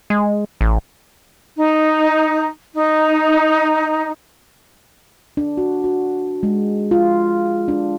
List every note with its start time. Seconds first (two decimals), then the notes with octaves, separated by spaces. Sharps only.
0.10 G#3
0.61 A1
1.57 D#4
2.75 D#4
5.37 D4
5.57 F#4
5.84 F#4
6.43 G#3
6.91 F4
7.68 D4